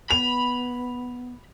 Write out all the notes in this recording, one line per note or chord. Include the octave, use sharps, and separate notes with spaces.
B3 B5 F7